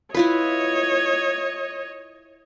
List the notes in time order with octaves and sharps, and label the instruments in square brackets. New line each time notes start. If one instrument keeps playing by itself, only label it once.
[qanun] E4 F4 B4 [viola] C#5 D#5